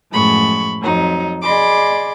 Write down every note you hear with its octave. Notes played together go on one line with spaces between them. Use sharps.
F#2 A2 F3 G#3 B5 C#6
F2 F#3 D#4
G#4 D5 D#5 B5 C6 D6